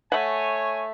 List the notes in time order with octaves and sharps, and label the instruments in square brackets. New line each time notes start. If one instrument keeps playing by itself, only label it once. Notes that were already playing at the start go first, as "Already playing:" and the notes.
[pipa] A3 F#5 [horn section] C#5 G#5